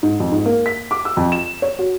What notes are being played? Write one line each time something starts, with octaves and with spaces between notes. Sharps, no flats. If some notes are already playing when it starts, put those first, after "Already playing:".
G#2
F2
G#2
A#3
B6
D6
E6
F2
E7
C#5
F#4